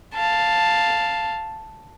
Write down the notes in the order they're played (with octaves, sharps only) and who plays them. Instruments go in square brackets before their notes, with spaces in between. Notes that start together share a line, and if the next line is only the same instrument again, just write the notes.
[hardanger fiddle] F5 A5